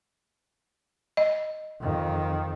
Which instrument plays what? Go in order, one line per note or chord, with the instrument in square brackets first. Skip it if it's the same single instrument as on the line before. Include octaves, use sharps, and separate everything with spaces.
[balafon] D#5
[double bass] F2 D#3